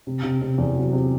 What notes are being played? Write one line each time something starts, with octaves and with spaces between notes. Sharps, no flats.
C3
C3
C3
E2
F#3
C3